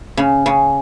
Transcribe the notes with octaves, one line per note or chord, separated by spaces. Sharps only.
C#3
C#3